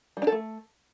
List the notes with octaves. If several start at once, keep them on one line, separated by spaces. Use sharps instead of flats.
G3
D4
A4
A3